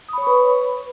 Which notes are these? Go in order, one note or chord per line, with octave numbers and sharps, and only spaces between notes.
B4 C#5 B5 C#6 D#6